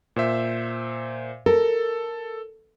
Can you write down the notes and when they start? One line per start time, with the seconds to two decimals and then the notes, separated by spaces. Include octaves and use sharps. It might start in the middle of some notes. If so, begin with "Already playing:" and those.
0.16 A#2 C5 E5
1.46 A4 A#4